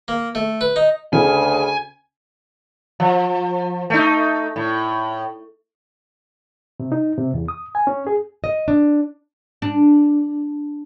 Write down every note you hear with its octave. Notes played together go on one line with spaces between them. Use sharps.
A#3
A3
B4
D#4
D2 C#3 G#5
F3
A3 D#4
A2
C3
D#4
C3
E2
D#6
G#5
C#4
G#4
D#5
D4
D4